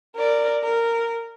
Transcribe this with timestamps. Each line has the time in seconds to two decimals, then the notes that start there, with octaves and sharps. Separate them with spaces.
0.16 A#4 D5
0.63 A#4